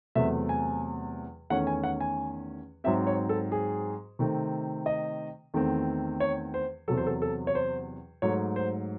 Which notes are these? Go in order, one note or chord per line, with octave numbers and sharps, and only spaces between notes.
E2 C3 F#3 A3 E5
G#5
E2 D#3 A3 C#4 F#5
G#5
F#5
G#5
G#2 F#3 C4 E5
C#5
A4
G#4
C3 D#3 A3 C4
D#5
E2 D#3 A3 C4
C#5
C5
E2 C3 F#3 A4
C5
A4
A4
C#5
C5
G#2 F#3 A3 C#5
C5